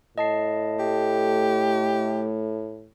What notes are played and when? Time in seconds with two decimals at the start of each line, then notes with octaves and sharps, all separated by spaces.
0.18 A2 D#5 A5 C7
0.79 A3 G4